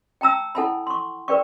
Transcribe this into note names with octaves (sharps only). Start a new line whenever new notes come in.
G5 A5 A#5 E6
E4 A4 F#5 G#5 A5 B5
C6 C#6
A#4 B4 D5 G5 C#6